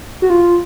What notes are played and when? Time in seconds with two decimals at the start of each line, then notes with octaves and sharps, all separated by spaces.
0.22 F#4
0.30 F4